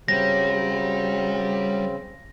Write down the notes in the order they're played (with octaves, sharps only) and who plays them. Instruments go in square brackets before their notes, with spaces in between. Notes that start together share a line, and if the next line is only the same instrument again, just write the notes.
[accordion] C#3 C4 [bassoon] F#3 [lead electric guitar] G3 [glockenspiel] A#6